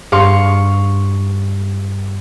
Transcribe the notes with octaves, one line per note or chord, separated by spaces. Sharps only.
G2 F5 C6 C#6